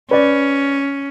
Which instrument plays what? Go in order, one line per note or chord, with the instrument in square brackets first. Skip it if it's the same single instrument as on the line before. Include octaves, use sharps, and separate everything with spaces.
[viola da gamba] C#4 [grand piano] B4 D5